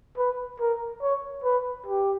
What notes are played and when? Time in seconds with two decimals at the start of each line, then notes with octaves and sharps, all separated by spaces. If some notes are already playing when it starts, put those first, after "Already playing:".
0.18 B4
0.60 A#4
1.02 C#5
1.44 B4
1.86 G4